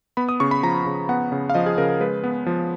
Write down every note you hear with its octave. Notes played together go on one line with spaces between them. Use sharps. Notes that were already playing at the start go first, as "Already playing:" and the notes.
B3 B5
D#6
C#3 C#6
B5
F3 A#5
C#3
B3 F#5
C#3
F5
F3 D#5
G#4
C#3 A#4
A#4
G#3 B4
B3
F3